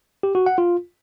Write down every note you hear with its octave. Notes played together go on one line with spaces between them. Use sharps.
G4
F#4
F#5
F4